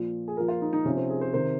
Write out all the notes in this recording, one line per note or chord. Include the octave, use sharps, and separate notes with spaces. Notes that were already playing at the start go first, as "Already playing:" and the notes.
Already playing: A#2 F3
G#4
A#2 F3 A#4
F4
D#4
D#4
C3 F3 C#4
C4
G#4
C5
C3 D#3 C5